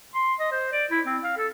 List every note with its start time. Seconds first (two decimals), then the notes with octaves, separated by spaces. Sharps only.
0.15 C6
0.40 D#5
0.52 C5
0.72 D5
0.91 E4
1.06 C4
1.24 F5
1.38 A4